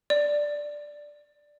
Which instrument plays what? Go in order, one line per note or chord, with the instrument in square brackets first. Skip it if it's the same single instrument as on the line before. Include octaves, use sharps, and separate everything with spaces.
[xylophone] D5